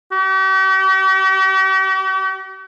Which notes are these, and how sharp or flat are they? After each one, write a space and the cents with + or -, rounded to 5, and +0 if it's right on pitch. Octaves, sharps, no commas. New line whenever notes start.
G4 -45